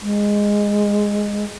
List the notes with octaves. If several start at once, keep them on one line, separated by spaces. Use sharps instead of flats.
G#3